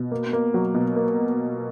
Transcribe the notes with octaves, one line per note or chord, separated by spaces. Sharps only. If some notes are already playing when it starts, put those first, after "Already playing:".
Already playing: B2
A#3
A#3
F#3
B2
A#3